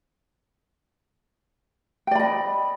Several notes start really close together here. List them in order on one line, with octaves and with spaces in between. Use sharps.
G5 D5 B5 D#5